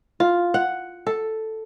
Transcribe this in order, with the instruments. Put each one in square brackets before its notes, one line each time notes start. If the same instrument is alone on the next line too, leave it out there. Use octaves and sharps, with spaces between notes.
[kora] F4
F#5
A4